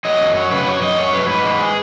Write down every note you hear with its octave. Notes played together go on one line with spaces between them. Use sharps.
F#3 D#5
F#2
F#3 C#5
C#3 B4
F#2 C#5
F#2 D#5
F#3 C#5
F#2 B4
G#2 B4
G#3
G#4